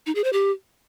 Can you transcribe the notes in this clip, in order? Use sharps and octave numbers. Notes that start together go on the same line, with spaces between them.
D#4
G#4
C5
G4